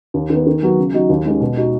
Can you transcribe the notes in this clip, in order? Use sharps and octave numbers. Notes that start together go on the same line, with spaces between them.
D#2
D#3 B3
D#3
F#3 B3 F#4
C#3
F#3 D#4 F#4
D#2
D#3 G#3 C#4
B2
B3 D#4 F#4